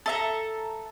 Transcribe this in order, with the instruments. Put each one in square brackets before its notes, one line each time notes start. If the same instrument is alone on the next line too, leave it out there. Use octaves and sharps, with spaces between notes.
[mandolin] A4 E5 A#5